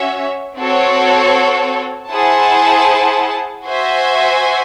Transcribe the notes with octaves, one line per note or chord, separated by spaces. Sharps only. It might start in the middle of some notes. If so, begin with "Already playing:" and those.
Already playing: C#4 F#4 C#5 E5
C4 F#4 A4 C#5
E4 G#4 C5 F#5 A5
F#4 C5 E5 G#5